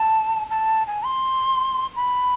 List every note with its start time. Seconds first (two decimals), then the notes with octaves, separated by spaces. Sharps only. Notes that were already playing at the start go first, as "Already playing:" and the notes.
Already playing: A5
0.51 A5
0.87 G#5
1.05 C6
1.96 B5